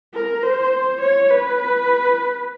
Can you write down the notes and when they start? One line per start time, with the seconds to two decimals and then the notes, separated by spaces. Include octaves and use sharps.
0.14 A#4
0.43 C5
1.01 C#5
1.30 B4